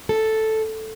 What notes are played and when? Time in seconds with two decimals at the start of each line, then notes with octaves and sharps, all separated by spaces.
0.09 A4